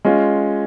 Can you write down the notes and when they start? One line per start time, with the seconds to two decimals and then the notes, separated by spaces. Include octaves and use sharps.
0.05 G#3 C#4 F4